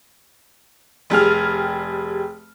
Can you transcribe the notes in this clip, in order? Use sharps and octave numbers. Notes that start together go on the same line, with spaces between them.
F1 G3 G#4 F6